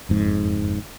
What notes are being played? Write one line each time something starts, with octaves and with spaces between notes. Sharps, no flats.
F#1 F2 G#2